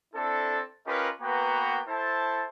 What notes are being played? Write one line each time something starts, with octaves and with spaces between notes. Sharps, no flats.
C4 D4 E4 A4
C#4 F4 G4 A#4 B4 D#5
A#3 B3 F#4 B4 G5 A#5
E4 A4 C5 A5